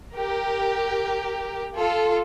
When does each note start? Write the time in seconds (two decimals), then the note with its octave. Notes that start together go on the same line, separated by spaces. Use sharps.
0.14 G4 A#4
1.76 F4 A4